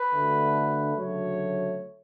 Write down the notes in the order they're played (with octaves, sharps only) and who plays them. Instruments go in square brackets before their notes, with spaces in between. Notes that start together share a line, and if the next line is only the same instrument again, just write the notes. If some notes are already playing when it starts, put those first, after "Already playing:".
Already playing: [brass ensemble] B4
D2 D3 A3
D2 C#3 F#3 A3 C#5